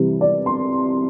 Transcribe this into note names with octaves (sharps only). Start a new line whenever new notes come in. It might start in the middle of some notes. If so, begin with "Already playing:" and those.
Already playing: C3 E3 G3
D5
C6